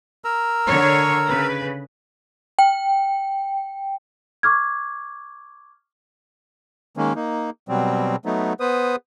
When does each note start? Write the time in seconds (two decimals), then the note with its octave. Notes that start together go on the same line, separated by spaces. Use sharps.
0.24 A#4 A#5 E6
0.68 D3 C#5
1.28 C#3 B4
2.59 G5
4.43 C#6 D6 F6 G#6
6.97 D#3 G#3 A#3 C#4
7.15 A#3 D#4
7.69 B2 F#3 G3 C4
8.26 F#3 A3 B3 D#4
8.60 B3 B4 C5 D#6